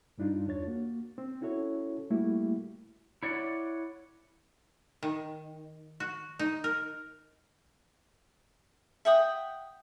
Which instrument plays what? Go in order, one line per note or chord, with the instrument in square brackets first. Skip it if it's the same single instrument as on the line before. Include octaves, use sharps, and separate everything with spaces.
[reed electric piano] G2 G3 D4 D#4 F4
E2 D4 C#5 A6
A#3 F#4
C4
C#4 E4 F#4 A4 C#5
G3 A3 A#3 E4 F#4 G4
[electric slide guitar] E4 C#5 D5 F#5
[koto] D#3
F#4
D#4
A#4
[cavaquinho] E5 F#5 G5 D#6